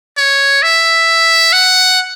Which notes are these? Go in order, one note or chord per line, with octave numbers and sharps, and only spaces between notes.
C#5
E5
F#5